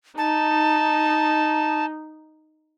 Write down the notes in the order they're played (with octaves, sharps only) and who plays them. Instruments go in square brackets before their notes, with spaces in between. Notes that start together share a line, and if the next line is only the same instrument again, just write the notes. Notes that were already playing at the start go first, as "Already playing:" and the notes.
[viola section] D#4 [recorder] A5